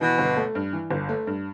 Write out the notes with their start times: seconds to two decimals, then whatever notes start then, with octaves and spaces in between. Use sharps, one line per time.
0.01 B2 E3
0.18 G1
0.36 A3
0.55 G2
0.73 E3
0.91 G1
1.09 A3
1.27 G2